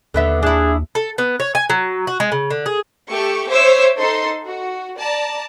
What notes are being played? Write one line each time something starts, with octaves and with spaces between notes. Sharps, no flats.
D#2 D3 B3 E5
D4 E4 G#4
A4
B3
C#5
G#5
F#3
F#4
G#3
C#3
D3
G#4
A3 G4 A4 C#6
C5 C#5 E5 D6 E6
D#4 A4 C6
F#4
D5 A5 A#5